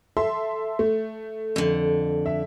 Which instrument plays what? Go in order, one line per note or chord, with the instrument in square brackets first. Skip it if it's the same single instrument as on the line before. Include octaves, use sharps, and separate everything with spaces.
[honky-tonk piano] A4 E5 C6
A3
[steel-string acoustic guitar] F2 D3
[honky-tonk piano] E5